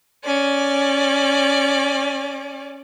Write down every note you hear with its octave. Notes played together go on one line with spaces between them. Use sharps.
C#4 D5